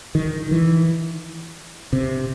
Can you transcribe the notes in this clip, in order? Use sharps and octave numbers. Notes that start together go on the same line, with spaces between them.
D#3
E3
C3